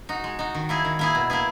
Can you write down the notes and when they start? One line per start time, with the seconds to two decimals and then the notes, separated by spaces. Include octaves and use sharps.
0.09 D#4 F#4
0.24 G#3
0.39 D#4 F#4
0.55 D#3
0.69 A#3 E4 G#4
0.85 D#3
0.99 A#3 E4 G#4
1.15 B2
1.30 A#3 E4 G#4